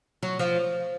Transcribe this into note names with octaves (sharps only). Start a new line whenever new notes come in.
F#3
F3